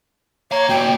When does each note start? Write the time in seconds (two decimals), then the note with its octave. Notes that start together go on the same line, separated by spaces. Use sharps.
0.51 C#5 F5 A#5
0.69 A#3 F#4 G5